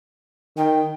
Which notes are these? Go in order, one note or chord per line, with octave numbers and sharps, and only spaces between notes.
D#3 G5